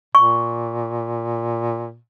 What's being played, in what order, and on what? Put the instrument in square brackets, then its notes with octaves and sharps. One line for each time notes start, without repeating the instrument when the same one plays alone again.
[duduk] A#2 [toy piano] C#6